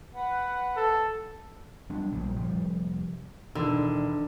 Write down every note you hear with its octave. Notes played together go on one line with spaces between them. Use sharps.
B4 F#5
A4
F#3 G3 B3 D4
A#1 A#2 G3
F1 F3 G3
E1 D3 D#3 E6